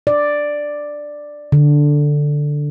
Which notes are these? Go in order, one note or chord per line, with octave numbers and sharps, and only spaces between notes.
D5
D3